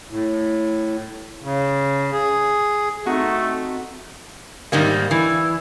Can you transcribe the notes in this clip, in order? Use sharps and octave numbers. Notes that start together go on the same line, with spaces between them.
A2
C#3
G#4
A3 C4 D#4 F#4
G#2 D#3 G3 A#3
E3